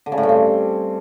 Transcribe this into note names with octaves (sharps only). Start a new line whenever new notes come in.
D3
C#3
A2
G2
C4